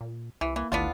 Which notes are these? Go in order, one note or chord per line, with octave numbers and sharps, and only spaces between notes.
A#2
C2 E3
E3 A#3
G#1 D2 B3 D4 E4 F4 F#5